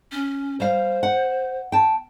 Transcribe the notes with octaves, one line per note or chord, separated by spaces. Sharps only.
C#4
G3 C5 F5
F#5
G5 A5